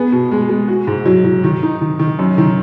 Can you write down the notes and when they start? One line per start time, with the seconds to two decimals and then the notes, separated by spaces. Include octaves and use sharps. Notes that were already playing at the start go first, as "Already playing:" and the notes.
Already playing: B3 G#4
0.12 B2
0.31 G#3
0.49 G#3
0.68 F#4
0.87 G#2
1.06 F#3
1.24 F#3
1.44 D#3
1.63 D#4
1.81 D#3
1.99 D#3
2.19 F#2
2.38 D#3